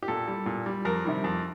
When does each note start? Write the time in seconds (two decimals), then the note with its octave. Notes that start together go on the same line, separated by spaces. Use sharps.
0.03 G4
0.08 A#2 A4
0.28 G3
0.46 A#2
0.66 G3
0.85 F2 A#4
1.05 C3 D#3 G3
1.24 F2